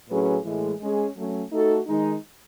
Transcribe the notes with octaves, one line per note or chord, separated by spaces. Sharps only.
A2 F#3 C#4 G#4 B4
A2 E3 G#3
G#3 C#4 G#4
F#3 A3 C#4
A3 D#4 F#4 A4
D#3 G#3 D#4